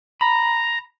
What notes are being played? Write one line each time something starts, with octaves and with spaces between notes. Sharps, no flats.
A#5 B5